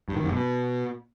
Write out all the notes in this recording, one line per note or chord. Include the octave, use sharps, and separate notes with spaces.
G2
D#3
F#2
B2